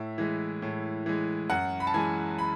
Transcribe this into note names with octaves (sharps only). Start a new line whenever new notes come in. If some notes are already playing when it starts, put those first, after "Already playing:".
Already playing: A2 E5
E3 G#3
A2
E3 G#3
F#2 F#5
B5
A5
E3 G#3 G#5
B5